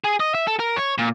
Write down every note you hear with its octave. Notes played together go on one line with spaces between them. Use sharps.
G#4
D#5
E5
A4
A#4
C#5
A#2